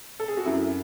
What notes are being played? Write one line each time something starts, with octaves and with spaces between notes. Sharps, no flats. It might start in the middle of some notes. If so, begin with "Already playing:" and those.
A4
G#4
F#4
F#2 E4